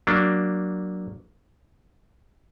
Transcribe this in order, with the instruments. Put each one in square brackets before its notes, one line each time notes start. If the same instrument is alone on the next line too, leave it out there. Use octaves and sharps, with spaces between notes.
[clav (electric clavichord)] F#3 A#3 D4